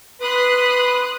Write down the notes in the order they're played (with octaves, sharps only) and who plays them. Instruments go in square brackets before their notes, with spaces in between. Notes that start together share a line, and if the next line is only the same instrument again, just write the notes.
[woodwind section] B4 [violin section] C6 D#6 F#6